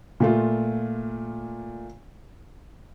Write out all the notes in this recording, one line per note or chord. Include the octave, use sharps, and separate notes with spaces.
A#2 A3 F4